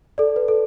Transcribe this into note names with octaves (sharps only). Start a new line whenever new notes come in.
A4 D5
B4
A4